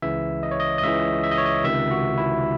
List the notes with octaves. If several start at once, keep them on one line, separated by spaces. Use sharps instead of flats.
C#2 C#3 E3 E5
D#5
C#5
D#5
D#5
C#2 C#3 E3 E5
E5
D#5
C#5
D#5
C#2 C3 D#3 E5
F#4
E4